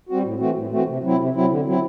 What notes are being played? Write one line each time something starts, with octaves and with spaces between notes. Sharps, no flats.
G3 C4 F#4
A2
E3 A3 C4 F#4
A2
E3 A3 C4 F#4
C3
F#3 C4 E4
C3
F#3 C4 E4
D3
F#3 C4 E4